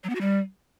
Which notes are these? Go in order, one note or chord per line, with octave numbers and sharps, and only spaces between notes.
F#3
B3
F#4
G3